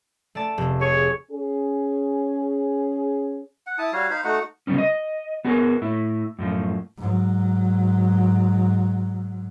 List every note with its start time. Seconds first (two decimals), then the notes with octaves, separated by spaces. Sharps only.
0.35 A3 D5 A5
0.58 F1
0.81 G#4 C#5
1.31 C#4 G#4
3.67 F#5
3.78 E4 A5 D#6
3.93 G3 F#4 C#5 F5
4.10 D#4 C5 F5 B5
4.24 A3 D#4 F#4 F#5
4.67 C#3 F#3 G3 B3 C#4
4.78 D#5
5.45 B3 F#4 G#4 A#4
5.82 A2 E4
6.39 F#2 A2 F3
6.97 G#2 F#3